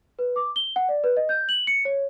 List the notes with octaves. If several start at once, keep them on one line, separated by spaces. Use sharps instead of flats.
B4
D6
G7
F#5
D5
B4
D#5
G6
F#7
C#7
C#5